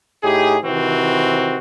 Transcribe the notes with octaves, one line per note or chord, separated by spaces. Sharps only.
A2 D#4 G4 G#4
C3 D#3 E3 C4 F#4